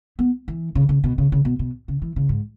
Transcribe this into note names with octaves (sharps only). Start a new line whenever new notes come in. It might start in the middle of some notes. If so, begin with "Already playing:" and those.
B3
E3
C#3
C#3
B2
C#3
C#3
B2
B2
C#3
E3
C#3
G#2